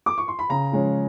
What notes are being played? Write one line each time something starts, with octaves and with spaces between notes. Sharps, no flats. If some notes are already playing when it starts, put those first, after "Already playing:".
D6
C#6
C6
B5
C#3 A#5
F3 G#3 C#4